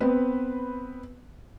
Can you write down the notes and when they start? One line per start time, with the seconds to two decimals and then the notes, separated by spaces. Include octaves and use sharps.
0.01 B3 C4 B4